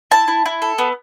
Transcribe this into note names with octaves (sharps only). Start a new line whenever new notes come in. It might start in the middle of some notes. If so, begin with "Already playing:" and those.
E4 A5
E4
E4
A4
B3